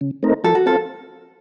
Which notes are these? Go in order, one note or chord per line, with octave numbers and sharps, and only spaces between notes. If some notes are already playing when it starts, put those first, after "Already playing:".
C#3
A3 C4 D#4 A#4
F3 A4
F#4
C4 F4 A4